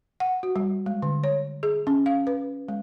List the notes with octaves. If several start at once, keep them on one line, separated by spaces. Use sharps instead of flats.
F#5
F#4
G3
G#3
D3
C#5
G#4
C#4
F5
B4
G#3